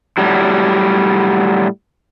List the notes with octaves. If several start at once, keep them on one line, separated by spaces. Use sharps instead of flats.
A2 F#3 G3